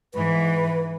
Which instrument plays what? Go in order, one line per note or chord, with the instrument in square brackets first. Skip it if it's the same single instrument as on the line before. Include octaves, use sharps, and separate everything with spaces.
[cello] G#2 E3 [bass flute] B4